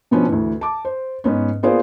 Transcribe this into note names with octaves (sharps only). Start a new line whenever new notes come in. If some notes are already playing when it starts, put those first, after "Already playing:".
B2 F3 B3 C#4 D4
D2 E3
A5 D6
C5
G#2 B3 C#4
A#3 B3 F4 G#4 C5 D5